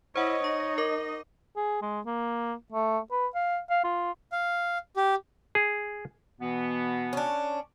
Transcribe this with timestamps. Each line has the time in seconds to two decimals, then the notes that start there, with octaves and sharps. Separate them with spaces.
0.16 E4 C5 C#5 D#5 F#5
0.44 D#4 C#6
0.78 A#4 D6
1.56 G#4
1.82 G#3
2.06 A#3
2.72 A3
3.11 B4
3.35 F5
3.70 F5
3.84 F4
4.32 F5
4.96 G4
5.55 G#4
6.40 B2 E3 B3
7.13 C#4 D4